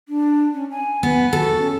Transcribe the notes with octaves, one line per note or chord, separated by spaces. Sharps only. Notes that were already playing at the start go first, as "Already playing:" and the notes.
D4
C#4
G#5
B3
F#4 A4
C#4